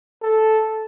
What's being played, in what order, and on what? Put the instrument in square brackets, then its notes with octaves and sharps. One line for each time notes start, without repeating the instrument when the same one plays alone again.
[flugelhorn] A4